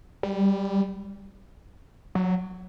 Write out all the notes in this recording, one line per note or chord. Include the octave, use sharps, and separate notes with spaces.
G3
F#3